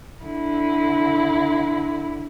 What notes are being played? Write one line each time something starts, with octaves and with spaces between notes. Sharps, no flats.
D3 E4